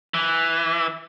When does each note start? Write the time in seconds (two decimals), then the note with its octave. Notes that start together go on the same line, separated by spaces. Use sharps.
0.14 E3